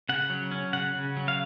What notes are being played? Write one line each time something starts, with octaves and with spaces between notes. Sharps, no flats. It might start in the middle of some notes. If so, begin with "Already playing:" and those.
C#3 F#5
F#3
C#4
C#3 F#5
C#3
F#3
F5